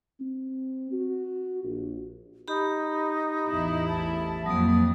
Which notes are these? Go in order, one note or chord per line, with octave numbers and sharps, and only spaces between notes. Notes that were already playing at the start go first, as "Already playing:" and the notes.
C4
F#4
A#1
D#4 G4 B5
A1 E2 E4
A5
F2 F#3 A#3 D#6